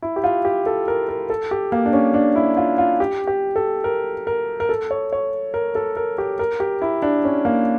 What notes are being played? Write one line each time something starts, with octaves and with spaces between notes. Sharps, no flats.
E4
G4
F4
G4
A4
A#4
A#4
A4
G4
A#3
D4
C#4
D4
E4
F4
F4
G4
G4
A4
A#4
A#4
A#4
A4
C#5
C#5
A#4
A4
A#4
G4
A#4
G4
E4
D4
C#4
A#3